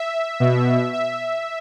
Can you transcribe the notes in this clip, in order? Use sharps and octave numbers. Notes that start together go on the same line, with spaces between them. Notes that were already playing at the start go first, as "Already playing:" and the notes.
Already playing: E5
B2
E5